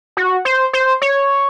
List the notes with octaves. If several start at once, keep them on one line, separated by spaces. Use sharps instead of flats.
F#4
C5
C5
C#5